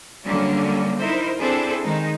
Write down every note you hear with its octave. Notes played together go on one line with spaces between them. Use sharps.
D3 F#3 G3 A#3 C#4
D#4 E4 A#4 C5
C4 D4 E4 G#4 A4 C5
D#3 G#3 D#4